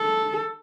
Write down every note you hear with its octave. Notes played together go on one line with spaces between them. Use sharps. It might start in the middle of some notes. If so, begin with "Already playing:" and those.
Already playing: A4